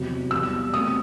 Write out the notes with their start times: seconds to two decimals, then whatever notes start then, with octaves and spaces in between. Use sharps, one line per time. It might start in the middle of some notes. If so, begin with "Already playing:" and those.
Already playing: E2 C3 F#3
0.31 E2 B2 G3 E6
0.73 B2 A3 C4 D#6